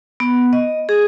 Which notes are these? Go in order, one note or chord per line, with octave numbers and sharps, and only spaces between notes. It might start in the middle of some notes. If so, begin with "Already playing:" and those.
B3
D#5
G#4